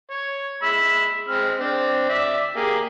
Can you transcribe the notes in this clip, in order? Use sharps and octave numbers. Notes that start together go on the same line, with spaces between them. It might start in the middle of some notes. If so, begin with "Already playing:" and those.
C#5
G#3 B5 E6
G#3 C4 F6
C4 D4
D5 E5
A#3 G4 G#4